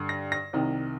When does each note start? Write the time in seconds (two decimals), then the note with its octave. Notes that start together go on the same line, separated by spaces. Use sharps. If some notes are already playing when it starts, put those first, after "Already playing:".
Already playing: G2 D3
0.09 A#6
0.32 A#6
0.53 C2 C3 D#3